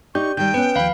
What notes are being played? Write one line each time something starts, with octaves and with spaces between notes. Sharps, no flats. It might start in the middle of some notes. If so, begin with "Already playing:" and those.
D#4 G4 D5 C#6 G6
D#3 G3 G5 G6
B3 C#4 B4
D#2 F3 F5 B5